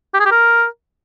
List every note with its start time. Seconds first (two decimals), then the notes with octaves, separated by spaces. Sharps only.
0.14 G4
0.20 G#4
0.26 G4
0.31 A#4